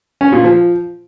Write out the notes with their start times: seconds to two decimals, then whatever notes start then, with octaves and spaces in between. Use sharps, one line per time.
0.21 C#4
0.32 A#2
0.44 F3